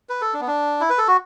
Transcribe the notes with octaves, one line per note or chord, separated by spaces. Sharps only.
B4
A4
D4
B3
D4
E4
B4
A4
F#4